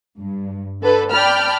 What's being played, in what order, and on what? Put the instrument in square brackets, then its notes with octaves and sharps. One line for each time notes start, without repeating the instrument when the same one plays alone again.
[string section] G2
D3 A4 B4
D5 G5 A5 B5 F6